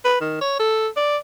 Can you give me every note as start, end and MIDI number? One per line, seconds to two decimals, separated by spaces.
0.05 0.16 71
0.21 0.39 51
0.41 0.57 73
0.60 0.88 69
0.97 1.17 74